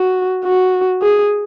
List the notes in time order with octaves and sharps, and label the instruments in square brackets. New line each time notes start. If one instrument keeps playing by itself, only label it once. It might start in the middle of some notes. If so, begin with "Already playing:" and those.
Already playing: [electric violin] F#4
F#4
G#4